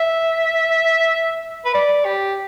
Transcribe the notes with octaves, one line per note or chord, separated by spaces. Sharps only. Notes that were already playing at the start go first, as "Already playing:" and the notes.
Already playing: E5
B4
D5
G4